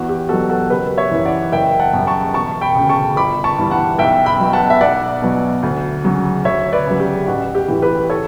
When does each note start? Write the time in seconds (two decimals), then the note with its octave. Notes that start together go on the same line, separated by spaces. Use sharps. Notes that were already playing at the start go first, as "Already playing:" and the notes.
Already playing: E2 F#4
0.09 G4
0.29 B2 F#3 F#4 A4
0.50 F#4 A4
0.70 F#1 G4 B4
0.97 C#5 E5
1.11 F#2 E3
1.25 D5 F#5
1.52 F#1 E5 G5
1.79 F#5 A5
1.93 F#2 C#3 G3
2.07 A5 C#6
2.34 E1 A5 C#6
2.61 G5 B5
2.75 D2 C#3
2.89 A5 C#6
3.16 G1 B5 D6
3.44 A5 C#6
3.58 G2 E3 G3
3.71 F#5 A5
3.99 B1 E5 G5
4.26 G5 B5
4.40 B2 F#3
4.53 F#5 A5
4.70 E5
4.81 B1 D5 F#5
5.22 B2 F#3
5.63 D2
6.04 C#3 F#3
6.45 D2 C#5 E5
6.73 B4 D5
6.86 C#3 F#3
7.00 G4
7.27 A1 F#4
7.55 G4
7.68 A2 E3
7.82 G4 B4
8.10 A4 C#5